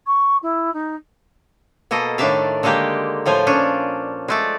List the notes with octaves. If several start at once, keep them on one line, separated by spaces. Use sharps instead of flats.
C#6
E4
D#4
B2 A#3 A4 D#5
A2 D#3 D4 D5 E5 F5
D3 D#3 G#3 A#3 G4
A2 F3 F4 G#5
A#2 C#4 D4
G#3 A3 D5